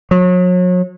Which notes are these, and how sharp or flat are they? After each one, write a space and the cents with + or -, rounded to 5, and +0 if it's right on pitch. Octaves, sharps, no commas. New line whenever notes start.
F#3 -35